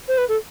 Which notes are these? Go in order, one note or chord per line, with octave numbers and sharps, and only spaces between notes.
C5
B4
A4